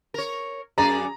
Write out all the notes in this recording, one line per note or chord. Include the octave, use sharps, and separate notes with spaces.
A#4 C#5
F#2 G#4 D5 A#5